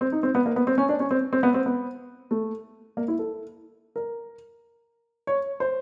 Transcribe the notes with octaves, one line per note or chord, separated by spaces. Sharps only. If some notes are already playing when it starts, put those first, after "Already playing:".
C4
D#4
C4
B3
A#3
B3
C4
C#4
D4
C#4
C4
C4
B3
C4
B3
A3
A#3
E4
A4
A#4
C#5
C5